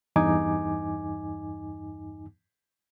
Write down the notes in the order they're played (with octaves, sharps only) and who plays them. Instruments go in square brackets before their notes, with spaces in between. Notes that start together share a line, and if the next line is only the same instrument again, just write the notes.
[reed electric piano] E2 G2 D#4 G#5 D6